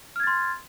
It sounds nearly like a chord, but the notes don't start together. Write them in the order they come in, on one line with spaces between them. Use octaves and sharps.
F6 G#6 A6 C6